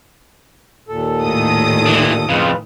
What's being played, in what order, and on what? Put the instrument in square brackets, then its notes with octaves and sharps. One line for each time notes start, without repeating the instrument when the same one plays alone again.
[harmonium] D#2 A#2 A4
[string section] A2 D#3 D#6
[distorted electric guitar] E3 D4
[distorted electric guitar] F2 C#3 [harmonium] F4 B4